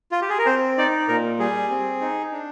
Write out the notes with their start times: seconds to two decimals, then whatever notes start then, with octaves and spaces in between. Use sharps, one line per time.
0.12 F4
0.21 G4
0.30 G#4
0.39 A#4
0.46 C4 C5
0.78 D#4 D5
1.08 A#2 A#4
1.39 G3 G#4
1.70 C4
2.01 D#4
2.32 D4